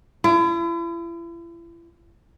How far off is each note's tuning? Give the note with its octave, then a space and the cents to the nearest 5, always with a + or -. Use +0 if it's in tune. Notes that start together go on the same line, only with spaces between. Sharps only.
E4 +40